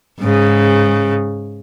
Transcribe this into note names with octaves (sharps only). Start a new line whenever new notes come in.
G#2 C#3